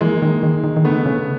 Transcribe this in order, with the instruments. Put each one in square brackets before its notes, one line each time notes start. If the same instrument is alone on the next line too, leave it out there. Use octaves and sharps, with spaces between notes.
[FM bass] E3 [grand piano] G#3 A#3
[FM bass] D#3
D#3
D#3
D#3
[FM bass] D3 [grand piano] A3 B3
[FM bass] C#3